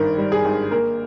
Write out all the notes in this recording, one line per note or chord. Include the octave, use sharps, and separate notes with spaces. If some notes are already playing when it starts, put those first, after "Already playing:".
Already playing: G#1 G2 D#3 A#4
G3
G#4
G#1
A#3 A#4